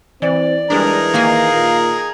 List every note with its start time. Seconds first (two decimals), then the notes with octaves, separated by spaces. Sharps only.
0.22 E3 C4 D5
0.70 E3 G3 G#3 D4 D#4 G#4 A#4
1.14 D#3 A#3 F5 G#5
1.53 A#2